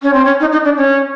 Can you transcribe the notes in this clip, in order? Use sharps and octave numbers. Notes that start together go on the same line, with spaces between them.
C#4
C4
C#4
D#4
D#4
D4
C#4